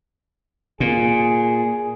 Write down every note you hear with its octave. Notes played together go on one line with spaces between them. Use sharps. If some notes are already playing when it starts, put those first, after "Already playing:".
A#2 G#4